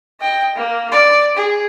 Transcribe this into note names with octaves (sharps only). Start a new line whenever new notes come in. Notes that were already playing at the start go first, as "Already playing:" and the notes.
D#5 G5
A#3
D5
G#4